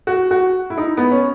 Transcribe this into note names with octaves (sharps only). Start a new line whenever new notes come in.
F#4
F#4
E4
D#4
B3
C#4